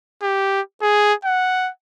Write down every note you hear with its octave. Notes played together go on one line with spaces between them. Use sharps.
G4
G#4
F#5